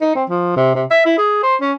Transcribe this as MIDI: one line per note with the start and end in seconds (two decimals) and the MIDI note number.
0.01 0.14 63
0.15 0.24 60
0.30 0.54 53
0.56 0.75 48
0.75 0.85 48
0.91 1.02 76
1.06 1.17 64
1.18 1.40 68
1.43 1.56 72
1.61 1.73 61